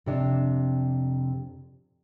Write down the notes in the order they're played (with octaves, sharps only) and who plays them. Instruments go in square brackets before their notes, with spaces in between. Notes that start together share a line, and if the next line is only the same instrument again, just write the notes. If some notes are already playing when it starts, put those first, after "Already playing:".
[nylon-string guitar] F2 C3 D4